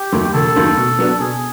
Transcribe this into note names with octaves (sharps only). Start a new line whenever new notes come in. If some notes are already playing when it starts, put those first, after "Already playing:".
Already playing: G4
D#2 D#3 F#3 A3
E1 A4
D#2 D#3 F#3 A3
B2
F#3 B3 D4
B2 G#4